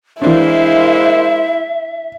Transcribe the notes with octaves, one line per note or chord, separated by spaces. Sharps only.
E3 G#3 A#3 D4 E4 C5 E5